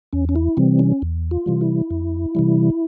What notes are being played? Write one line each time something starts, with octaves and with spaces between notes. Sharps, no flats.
E2 C#4
C#4
E4
C3 E3 G3 C4
C#4
E2
F4
C3 E3 G3
E4
F2
C3 E3 G3